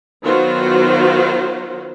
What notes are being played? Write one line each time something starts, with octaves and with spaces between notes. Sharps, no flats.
D#3 F#3 B3 F4 F#4 C5